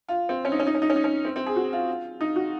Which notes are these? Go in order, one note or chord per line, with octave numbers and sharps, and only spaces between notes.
F4
C4
C#4
D#4
C#4
D#4
C#4
D#4
C#4
D#4
C#4
C4
C4
G#4
F#4
F4
D#4
F#4